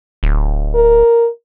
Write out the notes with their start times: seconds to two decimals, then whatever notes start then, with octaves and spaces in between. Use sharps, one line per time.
0.23 D1
0.75 A#4